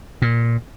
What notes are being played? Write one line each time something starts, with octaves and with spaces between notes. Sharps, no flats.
A#2